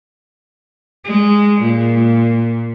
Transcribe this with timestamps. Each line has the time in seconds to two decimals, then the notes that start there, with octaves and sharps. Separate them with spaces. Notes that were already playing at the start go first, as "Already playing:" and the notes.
1.05 G#3
1.61 A#2